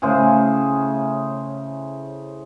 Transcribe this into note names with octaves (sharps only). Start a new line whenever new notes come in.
A2 C#3 G#4 C5